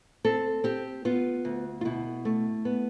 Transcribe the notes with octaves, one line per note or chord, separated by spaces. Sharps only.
C4 A4
C4 G4
B3 F4
D2
F4
B2 E4
A3
B3